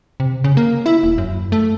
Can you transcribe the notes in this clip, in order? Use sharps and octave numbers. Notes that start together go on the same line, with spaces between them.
C3
C#3
A#3
E4
D#1
F#2
A3